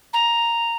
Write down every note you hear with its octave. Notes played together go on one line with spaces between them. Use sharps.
A#5